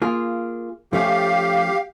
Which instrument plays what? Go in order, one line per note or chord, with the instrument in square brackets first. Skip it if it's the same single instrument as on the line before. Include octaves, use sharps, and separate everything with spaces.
[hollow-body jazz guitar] A#3 F4 G#4
[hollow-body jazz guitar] F3 A3 C#4 [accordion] G4 F5